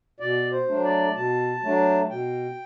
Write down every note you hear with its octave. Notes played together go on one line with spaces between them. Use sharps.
B2 D5
C5
F#3 A3 D4
D5
B2 A5
F#3 A3 D4
B2 G5